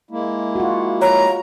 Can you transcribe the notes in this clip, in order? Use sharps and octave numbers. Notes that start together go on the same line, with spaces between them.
G#3 A#3 E4
F4 F#4
C#5 A#5